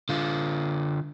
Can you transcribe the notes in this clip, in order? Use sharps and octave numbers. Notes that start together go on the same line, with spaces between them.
D3 F4